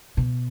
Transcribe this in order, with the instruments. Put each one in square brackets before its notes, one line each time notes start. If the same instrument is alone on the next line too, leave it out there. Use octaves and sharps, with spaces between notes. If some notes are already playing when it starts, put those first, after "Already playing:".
[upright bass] B2